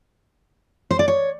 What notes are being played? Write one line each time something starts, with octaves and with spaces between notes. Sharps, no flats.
C5
D5
C#5